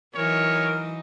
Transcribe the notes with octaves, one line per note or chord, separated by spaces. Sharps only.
E3 F#3 D#4 A#4 C#5